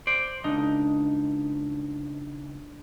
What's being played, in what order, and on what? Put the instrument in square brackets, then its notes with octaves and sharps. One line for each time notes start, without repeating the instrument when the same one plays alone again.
[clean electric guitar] C5 D5
[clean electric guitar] C#2 D#4 [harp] D4